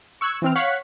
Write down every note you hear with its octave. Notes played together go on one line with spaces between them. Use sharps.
C#6 E6 F#6 G#6
E3 C4 F6
C#5 F5 F#5 C#6 F#6 B6